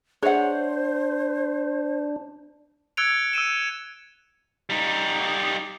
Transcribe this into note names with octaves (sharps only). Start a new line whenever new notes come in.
D4 G#4 C5 C#5 E5 F#5
E6 F#6 G#6 C#7 D7 F7
E6 C#7 D#7 E7
G3 D#4